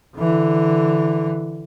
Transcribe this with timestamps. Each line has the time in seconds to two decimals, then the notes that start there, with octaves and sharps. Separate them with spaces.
0.16 D3 E3